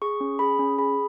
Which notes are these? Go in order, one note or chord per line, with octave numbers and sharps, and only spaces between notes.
G#4 C#6
C#4
G#4 B5
C#4
G#4 B5